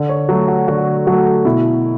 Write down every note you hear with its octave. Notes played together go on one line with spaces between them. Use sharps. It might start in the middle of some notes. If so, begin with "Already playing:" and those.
Already playing: D3
C#5
F#3 A3 F#4
F#4
D3 F#4
F#3 A3 F#4
B2 E4